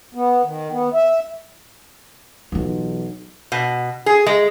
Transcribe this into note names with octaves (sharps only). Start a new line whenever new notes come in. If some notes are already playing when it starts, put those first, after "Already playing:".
B3
D#3
B3
E5
B1 E3 F4
B2
G#4
G#3